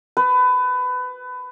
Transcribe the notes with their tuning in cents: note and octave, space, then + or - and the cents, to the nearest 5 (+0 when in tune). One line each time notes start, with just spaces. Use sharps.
B4 +25